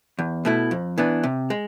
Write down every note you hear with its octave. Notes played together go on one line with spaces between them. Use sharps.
E2
B2 A3 E4
F2
E3 B3 D4
C3
G#3